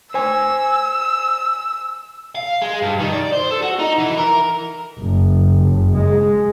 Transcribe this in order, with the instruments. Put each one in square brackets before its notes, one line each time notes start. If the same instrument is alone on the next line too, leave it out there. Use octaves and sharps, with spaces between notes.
[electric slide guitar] C5 G#5 [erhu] E6
[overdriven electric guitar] F5
G#3
G2
D#3
D5
C5
A4
F#4
D#4
E3
A#4
[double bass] F#1
G#3